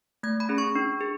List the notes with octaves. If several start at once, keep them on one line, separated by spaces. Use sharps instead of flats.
A3 G#6
B5
C#4 G#4
C#6
D4
G#4